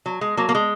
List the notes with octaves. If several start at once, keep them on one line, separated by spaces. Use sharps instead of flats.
F#3
G#3
F#3 A#3
A#3
G#3